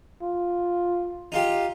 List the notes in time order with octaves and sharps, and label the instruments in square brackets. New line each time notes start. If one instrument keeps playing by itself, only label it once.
[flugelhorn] F4
[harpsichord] D#4 F4 G4